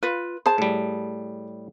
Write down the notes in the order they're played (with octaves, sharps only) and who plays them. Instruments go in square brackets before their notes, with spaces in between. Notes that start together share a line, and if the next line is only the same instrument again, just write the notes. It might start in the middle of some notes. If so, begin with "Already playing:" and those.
[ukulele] F4 B4
[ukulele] G#4 A5 [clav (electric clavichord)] C5
[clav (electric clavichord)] A2 G3